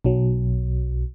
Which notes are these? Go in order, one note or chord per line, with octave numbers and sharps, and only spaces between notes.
B1 F#3